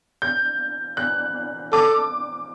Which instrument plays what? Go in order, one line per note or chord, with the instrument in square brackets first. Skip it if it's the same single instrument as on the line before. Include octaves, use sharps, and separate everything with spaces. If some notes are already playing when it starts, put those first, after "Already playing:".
[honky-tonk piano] G6
F#6
[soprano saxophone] A4 [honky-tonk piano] D6